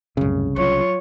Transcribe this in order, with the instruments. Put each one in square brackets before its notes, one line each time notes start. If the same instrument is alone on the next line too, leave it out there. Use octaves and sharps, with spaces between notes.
[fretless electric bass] C2 C#3 [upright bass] F#2 A2
[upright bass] F#3 [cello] F4 C#5